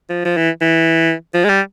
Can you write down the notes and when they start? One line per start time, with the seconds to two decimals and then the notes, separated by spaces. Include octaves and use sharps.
0.10 F3
0.25 F3
0.37 E3
0.61 E3
1.34 F3
1.44 G#3
1.49 G3